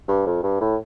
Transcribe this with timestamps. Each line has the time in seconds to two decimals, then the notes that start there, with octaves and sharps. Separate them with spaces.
0.08 G2
0.26 F2
0.43 G2
0.61 A2